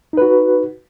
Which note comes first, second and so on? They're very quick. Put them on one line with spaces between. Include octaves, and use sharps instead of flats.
D#4 B4 F#4